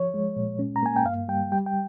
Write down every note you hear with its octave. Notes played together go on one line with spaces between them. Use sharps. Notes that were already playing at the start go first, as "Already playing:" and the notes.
Already playing: F3 C#5
G#3
A#2
C#4
A#5
A#3 G#5
G5
G2 F5
G3 G5
G3 G5
G5